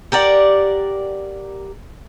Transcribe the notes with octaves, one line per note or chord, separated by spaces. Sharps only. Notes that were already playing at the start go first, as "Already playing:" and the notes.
G4 A#4 D5 F#5